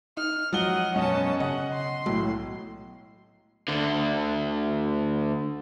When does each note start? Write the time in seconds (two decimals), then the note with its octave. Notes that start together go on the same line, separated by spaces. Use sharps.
0.17 D#4 F6
0.53 F3 F#3 D#5 F#5 G7
0.96 F#2 B2 C#4 D#5 A5
1.40 C#3 D#5 F#5
1.74 C6
2.06 B1 A2 F#3
3.68 D2 D3